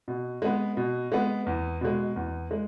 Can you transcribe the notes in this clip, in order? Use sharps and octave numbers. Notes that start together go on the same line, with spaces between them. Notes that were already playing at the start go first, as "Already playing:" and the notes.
B2
G#3 B3
B2
G#3 B3
E2
B2 G#3
E2
G#3